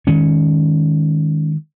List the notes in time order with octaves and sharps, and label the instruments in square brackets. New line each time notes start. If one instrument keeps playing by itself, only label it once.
[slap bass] D#3 G#3 C#4